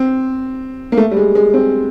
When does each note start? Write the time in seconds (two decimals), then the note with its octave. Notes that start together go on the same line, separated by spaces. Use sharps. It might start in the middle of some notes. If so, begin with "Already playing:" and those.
Already playing: C4
0.92 A#3
0.97 A3
1.11 G3
1.17 G#3
1.35 G#3
1.54 C4